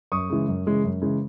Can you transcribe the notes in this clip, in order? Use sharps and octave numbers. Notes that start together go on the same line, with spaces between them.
F#2 C#6 D#6
C#3 E3 G#3
F#2
C#3 E3 G#3
F#2
C#3 E3 G#3